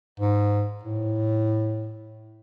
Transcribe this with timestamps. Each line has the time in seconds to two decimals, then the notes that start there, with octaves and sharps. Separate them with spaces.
0.20 G#2
0.83 A2